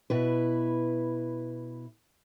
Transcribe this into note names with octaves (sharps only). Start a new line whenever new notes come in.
B2 E4 B4